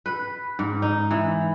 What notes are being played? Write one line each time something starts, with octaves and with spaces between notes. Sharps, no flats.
B4
G#2
D#4
E3